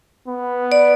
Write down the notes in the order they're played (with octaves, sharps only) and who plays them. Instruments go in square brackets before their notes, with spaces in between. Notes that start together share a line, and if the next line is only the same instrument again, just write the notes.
[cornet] B3
[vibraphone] D5